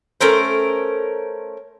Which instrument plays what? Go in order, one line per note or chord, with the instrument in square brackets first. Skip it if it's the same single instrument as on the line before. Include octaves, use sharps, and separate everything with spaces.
[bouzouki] A3 C#4 A#4 C5